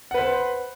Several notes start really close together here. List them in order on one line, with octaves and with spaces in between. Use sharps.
F#5 B4 C5